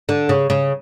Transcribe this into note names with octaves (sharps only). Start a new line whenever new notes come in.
D3
C#3
C#3